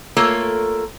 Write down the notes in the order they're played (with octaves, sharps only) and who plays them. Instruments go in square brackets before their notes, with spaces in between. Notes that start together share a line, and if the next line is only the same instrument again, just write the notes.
[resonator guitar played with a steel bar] A3 A#3 F4 A4 A#4 C#5